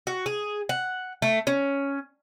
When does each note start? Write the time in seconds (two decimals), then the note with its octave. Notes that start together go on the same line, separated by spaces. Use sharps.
0.07 F#4
0.26 G#4
0.69 F#5
1.22 A3
1.47 C#4